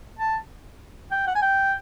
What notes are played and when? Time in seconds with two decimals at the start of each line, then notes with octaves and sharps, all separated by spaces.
0.19 A5
1.12 G5
1.27 F#5
1.35 G#5
1.42 G5